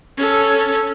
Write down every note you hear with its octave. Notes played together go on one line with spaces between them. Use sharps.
C#4 A4